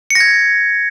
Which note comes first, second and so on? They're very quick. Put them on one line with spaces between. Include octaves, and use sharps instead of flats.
C#7 A#6 G#6